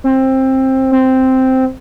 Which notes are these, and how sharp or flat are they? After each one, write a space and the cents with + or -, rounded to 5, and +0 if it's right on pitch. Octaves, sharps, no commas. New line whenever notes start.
C4 +15
C4 -5